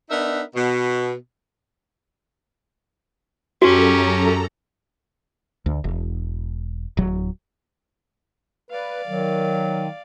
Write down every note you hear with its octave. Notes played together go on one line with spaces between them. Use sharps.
B3 D4 D#4 A#4 E5
B2
F#2 C#4 F#4 G4 A4 A#5
D2
E1
D1 F#3
B4 D5 F5
D#3 F#3